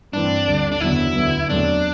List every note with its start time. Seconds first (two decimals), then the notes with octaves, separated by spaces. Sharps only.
0.13 G2 E3 A3 C4 D4
0.46 D2 D3 G3
0.72 D4
0.80 F#1 E2 D3 F#3 B3 E4
1.15 D2 D3 F#3 B3
1.49 E2 D3 F#3 A3 C4 D4